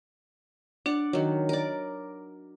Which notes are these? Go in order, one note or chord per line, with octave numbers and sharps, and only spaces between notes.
D4 D5 F#5
D#3 F#3
A#4 D5